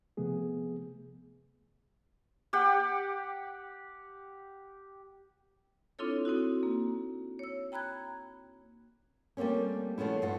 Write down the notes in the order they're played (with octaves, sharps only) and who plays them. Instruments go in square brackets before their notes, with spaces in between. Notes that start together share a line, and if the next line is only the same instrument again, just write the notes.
[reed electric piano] C3 F3 A3 B3 G#4
[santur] G4 F#5
[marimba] C4 D4 E4 F4 A4 C#5
C4 D#4 E4 F#4
A#3
C#5 E6
G5 A#5 B5 F#6 G#6
[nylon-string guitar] G3 A3 A#3 C4 C#4
F3 A3 B3 C#4 E4
G2 A3 F4 F#5